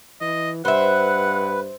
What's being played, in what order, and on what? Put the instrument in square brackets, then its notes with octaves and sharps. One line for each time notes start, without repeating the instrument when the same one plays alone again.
[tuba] E3 [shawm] D#5
[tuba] G2 [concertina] B4 [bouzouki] C5 E5 [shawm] F#5